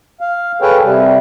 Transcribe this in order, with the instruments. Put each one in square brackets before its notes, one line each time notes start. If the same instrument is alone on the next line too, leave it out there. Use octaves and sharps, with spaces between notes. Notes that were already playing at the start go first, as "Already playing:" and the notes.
[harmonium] F5
G#4 A4 B4 C#5 F5 G5
C3 G3